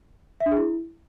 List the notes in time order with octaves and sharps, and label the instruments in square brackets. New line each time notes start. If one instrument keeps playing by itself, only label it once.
[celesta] E5
D4
G#4
E4